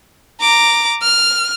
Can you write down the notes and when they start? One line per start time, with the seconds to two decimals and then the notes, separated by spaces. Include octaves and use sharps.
0.41 A#5 D6
1.02 F6